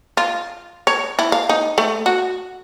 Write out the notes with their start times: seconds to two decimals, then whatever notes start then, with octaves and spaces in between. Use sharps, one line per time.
0.17 F4
0.87 C#5
1.19 E4
1.32 F5
1.49 D#4
1.78 A3
2.06 F#4